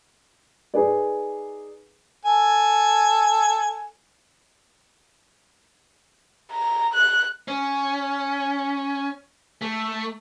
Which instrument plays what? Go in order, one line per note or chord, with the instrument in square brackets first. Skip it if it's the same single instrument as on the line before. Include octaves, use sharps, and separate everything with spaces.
[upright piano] D#4 G#4 B4 D5
[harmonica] A4 G#5
[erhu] A#5
F#6
[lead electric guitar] C#4
A3